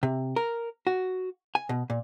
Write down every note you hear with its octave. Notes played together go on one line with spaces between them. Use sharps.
C3
A#4
F#4
G#5
B2
A#2